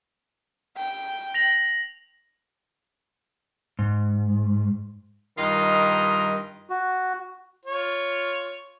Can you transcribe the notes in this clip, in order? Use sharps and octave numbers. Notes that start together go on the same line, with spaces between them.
G5
A#6 F7 F#7
G#2
G2 D#3 F4 A#4 D#5
F#4
F4 C#5